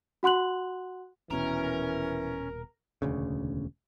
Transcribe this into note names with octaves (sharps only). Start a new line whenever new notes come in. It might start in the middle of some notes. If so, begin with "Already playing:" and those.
F#4 F#5 C6 F#6 F#7
D#1 B2 E3 C#4 A#4
E1 D2 C#3